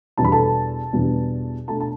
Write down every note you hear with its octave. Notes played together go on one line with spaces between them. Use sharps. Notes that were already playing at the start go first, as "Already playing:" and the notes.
E2 B2 G3 B3 D4 A5
B5
A4 A5
E2 B2 G3 B3 D4
B2 A3 D4 A4 A5
A5